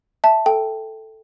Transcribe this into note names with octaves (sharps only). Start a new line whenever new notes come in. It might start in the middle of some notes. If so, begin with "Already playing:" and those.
E5 A5
A4 G5